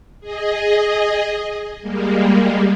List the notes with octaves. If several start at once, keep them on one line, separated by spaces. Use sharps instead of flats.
G#4 D#5
G3 G#3 A#3